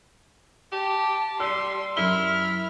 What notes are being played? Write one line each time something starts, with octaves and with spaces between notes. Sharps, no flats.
G4 A5
G3 C6 E6
F#2 E4 F6 G7